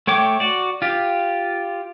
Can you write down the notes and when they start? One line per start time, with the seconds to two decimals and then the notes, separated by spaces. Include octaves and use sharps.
0.07 A3 C#5 G5 D6
0.40 F#4 D5
0.82 F4 G4